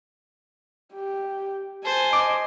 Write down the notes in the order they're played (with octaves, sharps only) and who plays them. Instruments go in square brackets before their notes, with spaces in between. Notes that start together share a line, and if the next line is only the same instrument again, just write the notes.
[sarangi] G4
[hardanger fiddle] C5 G#5 [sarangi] A5
[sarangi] D#5 [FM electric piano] D6